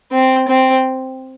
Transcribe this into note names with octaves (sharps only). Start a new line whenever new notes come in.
C4
C4